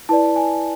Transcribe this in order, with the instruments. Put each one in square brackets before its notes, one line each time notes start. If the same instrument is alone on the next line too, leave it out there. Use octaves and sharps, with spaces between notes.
[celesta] E4 B4 D5 A5
G#5